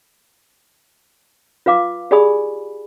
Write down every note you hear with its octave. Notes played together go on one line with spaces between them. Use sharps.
F4 B4 F5 D6
G4 G#4 D5 G#5 B5 D#6